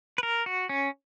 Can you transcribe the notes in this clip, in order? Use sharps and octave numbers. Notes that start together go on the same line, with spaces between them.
B4
A#4
F#4
C#4